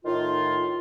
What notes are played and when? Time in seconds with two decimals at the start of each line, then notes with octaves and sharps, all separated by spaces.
0.05 A2 D#3 D#4 F4